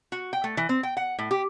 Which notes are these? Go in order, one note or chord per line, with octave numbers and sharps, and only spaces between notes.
F#4
G5
A3
E3
C4
G5
F#5
A2
G4